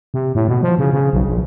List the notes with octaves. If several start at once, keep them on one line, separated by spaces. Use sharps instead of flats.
C3
A2
B2
F3
C#3
C#3
B1
A#1